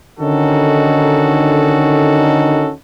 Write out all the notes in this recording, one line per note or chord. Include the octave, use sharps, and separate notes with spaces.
D3 D#3 C#4 D#4 F#4 A4